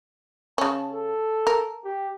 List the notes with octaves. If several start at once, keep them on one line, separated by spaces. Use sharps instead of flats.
C#3 C#4 A5
A4
A#4
G4